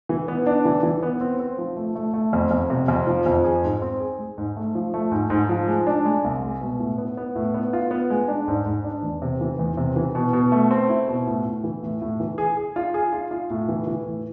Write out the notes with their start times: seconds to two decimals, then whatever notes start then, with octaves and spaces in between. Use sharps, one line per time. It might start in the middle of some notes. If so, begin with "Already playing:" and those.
0.09 E3
0.28 B3
0.47 D4
0.65 E3
0.83 E3
1.03 B3
1.21 C4
1.39 C4
1.58 F3
1.76 A3
1.95 A3
2.14 A3
2.33 F2
2.51 F2
2.70 C3
2.88 F2
3.07 F3
3.26 F2
3.44 G#4
3.63 G#2
3.82 C4
4.00 G#4
4.18 G#3
4.38 G#2
4.57 A3
4.75 F3
4.94 A3
5.12 G#2
5.30 G#2
5.49 F3
5.68 G#3
5.87 D4
6.05 G#3
6.24 C2
6.42 G#3
6.61 B2
6.79 A2
6.98 B3
7.17 B3
7.35 A2
7.54 B3
7.73 F4
7.91 B3
8.10 G#3
8.28 D4
8.48 G#2
8.66 G#2
8.84 D4
9.03 E2
9.22 C3
9.41 E3
9.59 E2
9.77 C3
9.96 E3
10.15 B2
10.33 B2
10.52 A3
10.71 C4
10.89 E4
11.08 B2
11.27 A2
11.45 A2
11.64 E3
11.83 A2
12.02 A2
12.20 E3
12.38 G#4
12.57 G#4
12.76 F4
12.94 G#4
13.13 F4
13.31 F4
13.50 A2
13.68 E3
13.87 E3
14.06 A2